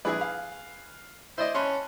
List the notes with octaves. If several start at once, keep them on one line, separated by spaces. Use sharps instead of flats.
A#1 E4 G#4 B4 G#5
F5
E4 C5 D5 D#5
C#4 A5 B5 C6 F#6